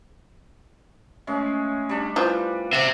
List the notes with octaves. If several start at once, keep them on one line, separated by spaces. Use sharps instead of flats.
G#3 A3 C#4
G3 D4
E3 F3
C5 E5